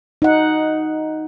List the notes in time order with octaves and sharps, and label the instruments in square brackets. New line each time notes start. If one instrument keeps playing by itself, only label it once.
[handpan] D#4 F#5